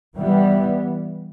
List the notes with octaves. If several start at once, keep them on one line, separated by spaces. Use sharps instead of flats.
E3 G3 B3